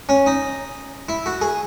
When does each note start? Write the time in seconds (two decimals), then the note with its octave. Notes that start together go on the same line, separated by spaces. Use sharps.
0.09 C#4
0.26 D#4
1.09 E4
1.26 F#4
1.41 G#4